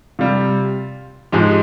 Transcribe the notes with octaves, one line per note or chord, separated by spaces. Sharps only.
C3 G3 F4
G#2 F3 G#3 G4